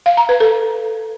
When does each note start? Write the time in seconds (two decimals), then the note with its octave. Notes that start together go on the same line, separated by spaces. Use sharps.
0.06 F5
0.17 A#5
0.29 B4
0.40 A4